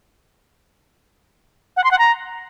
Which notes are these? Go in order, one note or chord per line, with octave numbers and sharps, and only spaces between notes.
F#5
C6
F#5
A#5